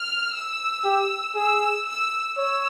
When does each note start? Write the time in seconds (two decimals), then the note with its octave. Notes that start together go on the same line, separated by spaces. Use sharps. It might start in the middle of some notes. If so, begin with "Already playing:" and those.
Already playing: F6
0.34 E6
0.84 G4
1.35 G#4 E6
1.87 E6
2.37 C#5 E6